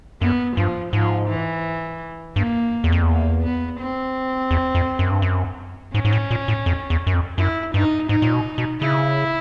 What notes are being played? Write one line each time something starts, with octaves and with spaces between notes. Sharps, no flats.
F#2 B3
G2 F3
G#2 F3
E3
G2 A#3
E2
F2
E2
A#3
B3
C4
E2
F2
F#2
G2
F#2
G#2 C#4
G#2
A2
A#2
A2
F2
E2
F#2
F2
F#2 E4
G2 D#4
G#2 D#4
A#2
B2
B2
C#3 E4